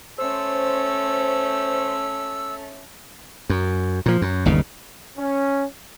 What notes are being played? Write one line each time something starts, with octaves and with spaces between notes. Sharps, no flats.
A3 C#4 C5 E6
F#2
A#2 F3
F#2
G1 D#2 C#3
C#4